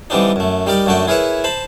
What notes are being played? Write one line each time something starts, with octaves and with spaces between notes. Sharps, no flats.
D3 E3 G3 C4 D4 D#4
F#2 A3
G3 D#4 G4 A#4 D5
F#2 D3 A3 F#4 G5
E4 G#4 A#4 B4 C#5 E5
C5 A5 B5